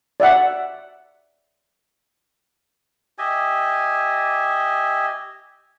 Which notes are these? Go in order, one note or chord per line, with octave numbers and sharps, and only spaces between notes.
D5 E5 F#5
G4 D#5 E5 G#5